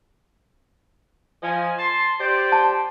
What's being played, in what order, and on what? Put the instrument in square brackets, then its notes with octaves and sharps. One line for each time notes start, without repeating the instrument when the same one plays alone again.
[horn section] F3 D#5 G#5
A5 C6
G4 C5 D5
[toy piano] A5